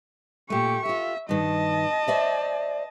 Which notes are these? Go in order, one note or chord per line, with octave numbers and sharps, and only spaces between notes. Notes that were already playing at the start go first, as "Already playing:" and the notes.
A#2 A3 G4 C#6
F4 G4 E5
G2 D#3 D#5 A5
C5 D5 E5